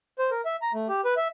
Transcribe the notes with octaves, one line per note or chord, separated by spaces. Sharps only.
C5
A#4
E5
A#5
A3
G4
B4
E5